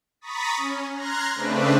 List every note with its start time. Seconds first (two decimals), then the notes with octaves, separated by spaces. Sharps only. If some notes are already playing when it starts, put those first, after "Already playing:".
0.21 A#5 B5 C#6 D#6 A6 B6
0.57 C#4
0.95 A#5 C6 F6 F#6 G#6 A#6
1.35 C#3 A3 C4 D4 B4